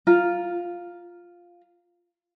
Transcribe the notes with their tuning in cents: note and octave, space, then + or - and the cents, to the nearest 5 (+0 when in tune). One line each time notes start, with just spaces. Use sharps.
F4 +0 A#5 +0